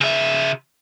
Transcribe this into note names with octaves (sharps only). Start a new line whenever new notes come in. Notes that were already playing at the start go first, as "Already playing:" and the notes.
C#3 E5